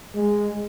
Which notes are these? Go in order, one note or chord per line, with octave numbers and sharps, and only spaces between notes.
G#3